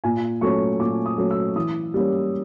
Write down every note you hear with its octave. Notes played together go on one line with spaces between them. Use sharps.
A#2 G#5
F#3 A3 C#4 C#6
A#2 D6
D#6
F#3 A3 C#4
E6
E3 D#6
G3 A#3 C#4